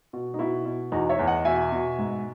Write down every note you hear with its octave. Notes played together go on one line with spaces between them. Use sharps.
B2
D#4
B2 E4
B2
E2 D#4 F#4
C#5 E5
E2
D#5 F#5
B2 E5 G#5
B2
G#2